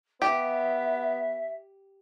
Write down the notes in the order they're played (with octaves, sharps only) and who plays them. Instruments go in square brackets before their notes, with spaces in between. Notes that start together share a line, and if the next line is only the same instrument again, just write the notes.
[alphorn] B3 [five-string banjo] G4 [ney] E5